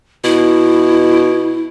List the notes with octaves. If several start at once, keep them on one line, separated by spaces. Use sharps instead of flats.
B2 E4